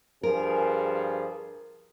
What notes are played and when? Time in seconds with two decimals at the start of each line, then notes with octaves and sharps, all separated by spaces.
0.23 G2 F3 G#4 A#4